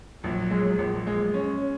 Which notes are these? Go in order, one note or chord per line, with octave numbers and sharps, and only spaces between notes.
A#1 F#3
G#3
A#1
G#3
C#4
C#4